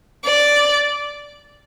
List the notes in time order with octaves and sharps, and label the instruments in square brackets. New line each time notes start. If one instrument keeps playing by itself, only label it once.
[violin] D5